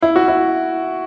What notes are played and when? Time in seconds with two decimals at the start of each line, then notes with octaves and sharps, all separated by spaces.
0.02 E4
0.16 F#4
0.28 E4